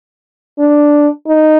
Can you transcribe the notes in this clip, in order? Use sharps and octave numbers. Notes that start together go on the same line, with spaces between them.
D4
D#4